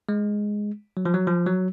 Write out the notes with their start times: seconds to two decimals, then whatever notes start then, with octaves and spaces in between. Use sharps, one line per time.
0.09 G#3
0.97 F#3
1.05 F3
1.14 F#3
1.27 F3
1.46 F#3